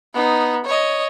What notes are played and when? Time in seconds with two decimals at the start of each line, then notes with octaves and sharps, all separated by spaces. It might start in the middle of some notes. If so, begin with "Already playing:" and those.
0.14 B3 D#4
0.65 C#5 D#5